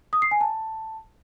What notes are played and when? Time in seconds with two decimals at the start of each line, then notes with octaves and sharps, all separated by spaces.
0.13 D#6
0.22 C7
0.31 G#5
0.41 A5